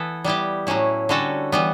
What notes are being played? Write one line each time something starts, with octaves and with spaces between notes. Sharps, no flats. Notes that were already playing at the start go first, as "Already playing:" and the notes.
Already playing: E3 B3 E4 A4
G3 B3 E4 G4
A2 F#3 C#4 E4
D3 G3 C#4 F#4 A4
E3 G3 B3